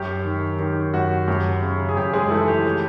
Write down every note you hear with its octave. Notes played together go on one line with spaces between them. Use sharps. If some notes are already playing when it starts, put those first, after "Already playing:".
Already playing: F#2 G4
D#3
D#3 G4
F#2 F#4
F#2 G4
C#3
G#4
F#2 G4
G#3 G#4
E3 A3 A4
G4
G4